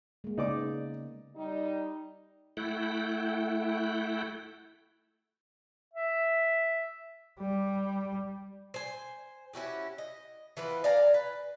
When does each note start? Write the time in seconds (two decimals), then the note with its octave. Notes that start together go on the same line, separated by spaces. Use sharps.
0.24 G#3 A#3
0.38 C#3 G#3 B3 D#4 D5 D6
1.37 G3 D#4
2.57 A3 E4 F#5 G5
5.94 E5
7.40 G3
8.74 C5 G#5
9.53 C#4 E4 F#4 G4
9.98 D#5
10.57 E3 B3 F4 B4
10.84 D5 F5 G#5 A#5
11.14 B4